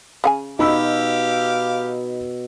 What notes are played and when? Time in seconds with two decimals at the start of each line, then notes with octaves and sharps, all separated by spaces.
0.24 C#3 F#5 G#5
0.59 B2 D#4 G4 F5 B5 E6